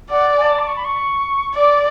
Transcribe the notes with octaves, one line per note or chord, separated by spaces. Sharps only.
D5 F#5
G#5
A5
D6
C#6
B5
C#6
D5 D6